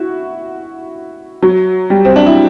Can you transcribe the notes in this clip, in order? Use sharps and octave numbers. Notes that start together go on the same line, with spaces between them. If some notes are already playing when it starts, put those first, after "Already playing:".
Already playing: E4 F#4
F#3
G3
C4
D4
E4